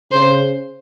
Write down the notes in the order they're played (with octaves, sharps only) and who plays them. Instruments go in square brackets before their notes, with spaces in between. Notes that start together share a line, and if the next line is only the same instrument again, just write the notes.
[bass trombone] C#3 [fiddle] C5